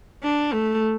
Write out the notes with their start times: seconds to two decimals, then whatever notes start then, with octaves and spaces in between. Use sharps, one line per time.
0.23 D4
0.53 A3